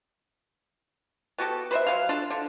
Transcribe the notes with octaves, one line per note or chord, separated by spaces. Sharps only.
B3 F#4 G4 A4
B4 C5 D#5 E5
F#3 G#3 F5
D4 F4 A4
D3